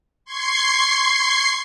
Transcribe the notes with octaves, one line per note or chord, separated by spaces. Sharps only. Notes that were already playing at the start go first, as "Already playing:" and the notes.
C6 C#6 G#6 C7